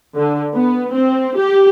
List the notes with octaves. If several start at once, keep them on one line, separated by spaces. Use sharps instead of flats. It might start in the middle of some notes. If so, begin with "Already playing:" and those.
D3
B3
C4
G4